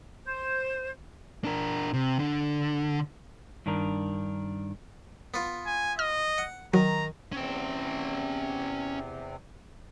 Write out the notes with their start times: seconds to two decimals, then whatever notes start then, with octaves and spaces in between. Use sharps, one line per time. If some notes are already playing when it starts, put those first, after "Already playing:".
0.25 C5
1.44 D4 A#4
1.94 C3
2.19 D3
3.66 G2 D#3 D4 A#4
5.34 B3 F4
5.66 G#5
5.99 D#5 F6
6.38 F#5
6.74 D#3 F#3 A#5
7.33 E2 C3 C4 C#4 G5